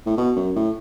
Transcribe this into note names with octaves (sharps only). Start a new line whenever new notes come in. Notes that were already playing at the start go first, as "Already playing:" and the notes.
A2
B2
F#2
A2